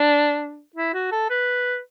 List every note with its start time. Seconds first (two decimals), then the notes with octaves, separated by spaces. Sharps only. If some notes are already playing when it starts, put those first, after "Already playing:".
Already playing: D4
0.76 E4
0.94 F#4
1.12 A4
1.30 B4